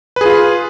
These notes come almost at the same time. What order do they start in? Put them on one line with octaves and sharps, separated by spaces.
B4 G#4 F4